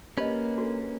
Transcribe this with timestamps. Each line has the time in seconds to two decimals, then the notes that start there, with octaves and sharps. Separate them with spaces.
0.18 A#3 C#4 G4 B4 D#5
0.57 D4 F#4 A4